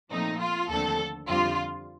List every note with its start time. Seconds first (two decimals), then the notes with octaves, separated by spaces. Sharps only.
0.11 A#2 F3 A3 C4 D#4
0.40 F4
0.69 D#2 D3 F3 A3 C4 A4
1.27 F2 D3 G3 C4 F4